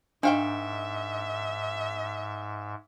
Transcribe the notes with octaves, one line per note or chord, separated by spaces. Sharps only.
G#2 D#3 D4 E5 F5 G5